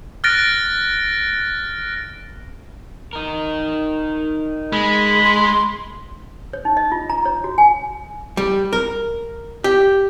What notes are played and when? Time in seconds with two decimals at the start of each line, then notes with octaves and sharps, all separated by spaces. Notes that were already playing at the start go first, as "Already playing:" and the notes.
0.24 F6 F#6 A6 A#6 D7
3.13 D#4 A#4
4.73 G#3 B5
5.25 C6
6.53 C#5
6.65 D#4
6.77 D#5
6.92 F4
7.09 A#5
7.25 C#5
7.44 F#4
7.58 G#5
8.37 G3
8.73 A#4
9.64 G4